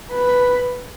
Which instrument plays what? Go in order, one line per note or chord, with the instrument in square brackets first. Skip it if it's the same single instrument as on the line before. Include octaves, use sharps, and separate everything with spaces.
[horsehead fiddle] B4